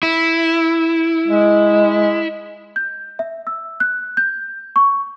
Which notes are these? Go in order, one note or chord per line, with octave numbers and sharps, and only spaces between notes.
E4
G#3
G6
E5
E6
F#6
G6
C#6